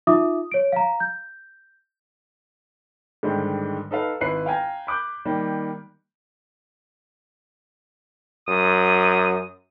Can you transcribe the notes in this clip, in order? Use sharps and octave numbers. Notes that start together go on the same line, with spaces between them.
D#4 F4 E5 D6 D#6
C#5 D7
F5 A#5
G6
G#2 D3 D#3 G3 G#3
D#4 A4 B4 F5
G#1 E4 B4 F#6 C7
F5 G5 G#5 A#5
B5 D6 F#6 G6
D#3 G3 A#3
F#2 D#6